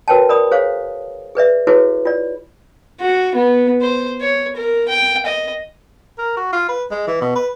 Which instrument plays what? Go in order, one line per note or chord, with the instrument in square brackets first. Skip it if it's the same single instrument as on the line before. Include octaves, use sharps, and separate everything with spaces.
[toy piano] F#4 A#4 B4 C#5 G5 A5
A#4 D5 B5 D#6
G#4 C5 C#5 F5
G#4 B4 D5 E5
E4 F#4 G#4 A4 B4 C#5
F4 D5
[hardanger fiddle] F#4
B3
C5
C#5
A#4
G5
D#5
[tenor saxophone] A#4
F#4
F4
B4
G#3
E3
B2
B4